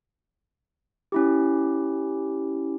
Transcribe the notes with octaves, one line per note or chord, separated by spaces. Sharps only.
C#4 E4 G4